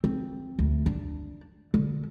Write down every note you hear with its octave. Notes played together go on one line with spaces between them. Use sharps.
C4
D2
D4
D3